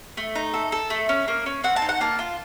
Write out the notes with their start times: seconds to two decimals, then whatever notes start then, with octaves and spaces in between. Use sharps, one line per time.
0.17 A3
0.36 D#4
0.54 A4
0.72 A4
0.90 A3
1.09 C#4
1.28 A#3
1.46 C#4
1.64 C4 F#5
1.76 A5
1.82 D#4
1.89 F#5
2.01 A#3 A5
2.19 F4